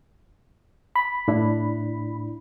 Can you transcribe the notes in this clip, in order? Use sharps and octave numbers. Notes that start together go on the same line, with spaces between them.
B5
A2 D4 E4